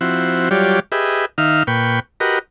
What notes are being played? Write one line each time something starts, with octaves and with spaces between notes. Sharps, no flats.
F3 C4 E4 F#4
F#3 G3 F4 G4 C#5 D5
G4 G#4 B4 D#5 E5
D#3 D#4 E5 F5 F6
A#2 B4 G5 C#6
F#4 G4 A#4 B4 D#5